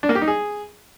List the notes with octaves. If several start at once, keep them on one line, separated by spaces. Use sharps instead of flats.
D4
A#3
G4
D#4
G#4